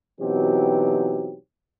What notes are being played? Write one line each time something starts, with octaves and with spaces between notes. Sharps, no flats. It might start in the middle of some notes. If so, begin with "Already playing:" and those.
B2 E3 F#3 C4 D#4 G4